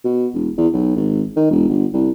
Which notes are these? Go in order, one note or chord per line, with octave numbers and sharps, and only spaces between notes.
B2
E1
E2
B1
G#1
D#3
E1
G1
C2